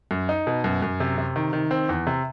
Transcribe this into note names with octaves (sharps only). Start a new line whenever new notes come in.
F#2
D#4
B2
F#2
F#2
C3
C3
D#3
D#3
C4
E2
C3